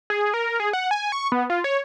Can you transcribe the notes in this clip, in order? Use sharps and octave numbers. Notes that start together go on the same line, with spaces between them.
G#4
A#4
G#4
F#5
G#5
C#6
B3
F4
C#5